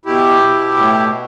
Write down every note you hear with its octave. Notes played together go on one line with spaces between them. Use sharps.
B2 E4 G4
B2
A2